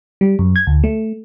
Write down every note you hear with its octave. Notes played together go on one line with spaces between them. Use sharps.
G3
F#2
G#6
D2
A3